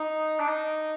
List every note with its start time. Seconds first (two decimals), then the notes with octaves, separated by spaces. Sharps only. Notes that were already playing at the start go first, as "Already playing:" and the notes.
Already playing: D#4
0.40 D4
0.48 D#4